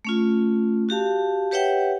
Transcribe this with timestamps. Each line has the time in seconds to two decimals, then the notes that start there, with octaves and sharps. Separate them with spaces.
0.05 A3 C#4 F4
0.89 F#4 G4 F5 A5
1.51 G4 B4 C#5 E5 F#5 G5